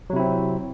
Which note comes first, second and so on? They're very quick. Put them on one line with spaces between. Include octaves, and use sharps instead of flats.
F#3 C3 E4 C4